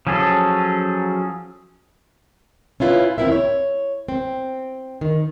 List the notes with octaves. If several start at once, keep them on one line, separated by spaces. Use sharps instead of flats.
F3 F#3 C#4 G#4 A4
C#4 E4 F4 B4
D#2 C4 D4 E4 A#4 E5
C#5
C4
D#3